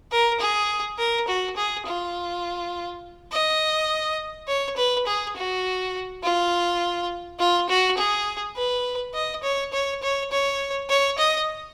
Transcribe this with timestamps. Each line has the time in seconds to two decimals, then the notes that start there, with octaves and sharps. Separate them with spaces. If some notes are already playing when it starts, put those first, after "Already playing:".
0.12 A#4
0.40 G#4
0.98 A#4
1.28 F#4
1.56 G#4
1.85 F4
3.32 D#5
4.48 C#5
4.77 B4
5.07 G#4
5.36 F#4
6.23 F4
7.39 F4
7.69 F#4
7.98 G#4
8.56 B4
9.14 D#5
9.43 C#5
9.73 C#5
10.02 C#5
10.31 C#5
10.89 C#5
11.18 D#5